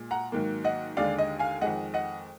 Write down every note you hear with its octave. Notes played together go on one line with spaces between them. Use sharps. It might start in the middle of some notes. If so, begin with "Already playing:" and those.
Already playing: A#2 G#3
F#5 A#5
G#2 D#3 F#3 A#3
D#5 F#5
D#2 D3 G#3 D5 F5
D#5
F5 G#5
F2 D#3 G#3 D#5 F#5
D#5 F#5